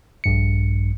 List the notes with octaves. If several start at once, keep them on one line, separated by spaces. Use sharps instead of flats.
A#1 G2 C#7